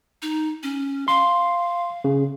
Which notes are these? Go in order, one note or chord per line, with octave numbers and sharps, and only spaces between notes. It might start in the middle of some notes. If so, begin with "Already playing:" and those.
D#4
C#4
F5 C6
C#3